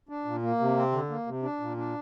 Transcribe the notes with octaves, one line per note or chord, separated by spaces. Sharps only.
D4
A#2
A#3
C3
C4
D3
A#3
C3
D4
A#2
D4